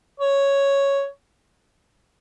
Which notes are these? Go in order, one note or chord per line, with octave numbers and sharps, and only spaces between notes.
C#5